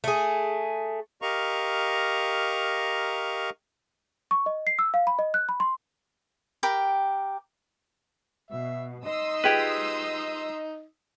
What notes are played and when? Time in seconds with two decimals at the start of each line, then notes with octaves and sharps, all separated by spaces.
0.04 A3 G#4
1.22 G4 A#4 D#5 F5 A#5 C#6
4.31 C#6
4.46 D#5
4.67 C7
4.79 E6
4.94 F5
5.07 B5
5.19 D#5
5.34 F#6
5.49 B5
5.60 C6
6.63 G4 A#4 G5 B5
8.51 B2 E5
9.06 D#4 D#5 C6 D#6 E6
9.44 F4 G4 G#4 B4 G5